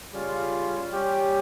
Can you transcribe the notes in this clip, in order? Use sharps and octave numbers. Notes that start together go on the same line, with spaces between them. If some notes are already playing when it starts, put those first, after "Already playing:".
C#3 G3 C#4 F4
G3 C#4 G4